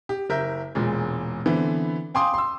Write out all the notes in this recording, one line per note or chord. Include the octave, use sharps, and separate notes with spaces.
G4
F#1 A#4 E5 G6
E1 A#2 G#3
D3 E3 B3 C4
F5 G5 G#5 C6 D6 D#6
C6 E6